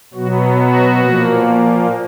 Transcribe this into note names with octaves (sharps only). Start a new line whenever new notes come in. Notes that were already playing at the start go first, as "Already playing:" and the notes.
B2 F#3 B3 F#4
F#4
A#2 F3 A#3